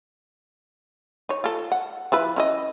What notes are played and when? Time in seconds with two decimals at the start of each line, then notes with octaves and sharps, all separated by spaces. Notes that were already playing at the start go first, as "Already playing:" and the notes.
1.29 D#4 C#5
1.44 F4 A4
1.72 F#5
2.12 F3 E4 B4
2.36 C#4 E4 D#5